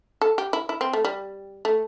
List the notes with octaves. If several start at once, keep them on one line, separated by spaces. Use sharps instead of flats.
A4
G4
E4
E4
C4
A3
G3
A3